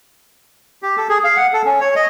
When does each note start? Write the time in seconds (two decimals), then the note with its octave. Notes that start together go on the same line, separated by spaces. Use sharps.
0.83 G4
0.97 A4
1.09 G#4
1.24 F5
1.37 F#5
1.53 A4
1.65 C#4
1.80 C#5
1.96 D#5